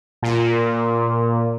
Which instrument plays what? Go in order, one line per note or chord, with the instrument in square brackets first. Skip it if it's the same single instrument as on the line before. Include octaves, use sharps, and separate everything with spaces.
[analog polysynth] A#2